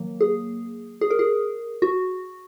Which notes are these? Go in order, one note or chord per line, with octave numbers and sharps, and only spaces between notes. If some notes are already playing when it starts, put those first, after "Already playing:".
Already playing: D#3 F#3 A#3
G#4
G#4
A#4
G#4
F#4